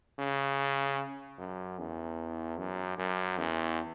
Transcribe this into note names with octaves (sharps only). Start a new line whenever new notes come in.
C#3
F#2
E2
F#2
F#2
E2